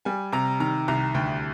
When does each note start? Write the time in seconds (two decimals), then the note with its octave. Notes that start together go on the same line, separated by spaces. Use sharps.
0.05 G3 G#5
0.32 C3 A#5
0.60 D#3 A#5
0.88 C2 A#5
1.14 D2 G5